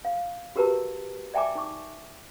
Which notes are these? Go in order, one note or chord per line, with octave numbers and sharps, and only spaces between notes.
F5
F#4 G4 A#4 B4 A5 A#5
D5 E5 G5 G#5 A#5 D6
D#4 G5 C#6 D6